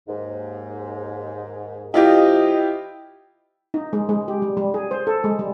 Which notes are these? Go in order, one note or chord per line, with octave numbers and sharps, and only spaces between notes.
D#2 G#2
F3 E4 F4 G4 D#5
D#4
G#3
G#3
G4
G3
G3
G#4
C5
A4
G#3
G3